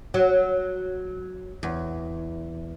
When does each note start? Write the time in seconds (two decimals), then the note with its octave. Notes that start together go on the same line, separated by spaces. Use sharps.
0.14 F#3
1.63 E2